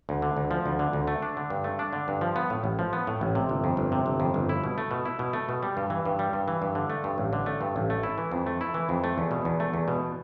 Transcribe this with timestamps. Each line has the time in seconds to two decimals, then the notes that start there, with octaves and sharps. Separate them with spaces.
0.09 D2
0.22 D3
0.37 D2
0.51 F3
0.66 D2
0.79 D3
0.93 D2
1.08 A3
1.22 D4
1.37 D3
1.50 G2
1.64 A3
1.79 D4
1.93 D3
2.08 G2
2.21 F3
2.36 B3
2.50 A2
2.64 A1
2.79 F3
2.93 B3
3.07 A2
3.21 A1
3.35 C3
3.49 G1
3.64 F2
3.77 G1
3.92 C3
4.06 G1
4.20 F2
4.34 G1
4.49 E4
4.64 B2
4.78 A3
4.91 B2
5.05 E4
5.19 B2
5.33 A3
5.49 B2
5.63 G3
5.77 G2
5.90 E3
6.05 G2
6.19 G3
6.33 G2
6.48 E3
6.62 G2
6.75 D3
6.90 A3
7.04 G2
7.18 A1
7.33 D3
7.46 A3
7.61 G2
7.76 A1
7.90 A3
8.03 E4
8.18 E3
8.31 F2
8.46 A3
8.61 E4
8.74 E3
8.89 F2
9.04 A3
9.18 E2
9.31 B2
9.45 E2
9.60 A3
9.74 E2
9.88 B2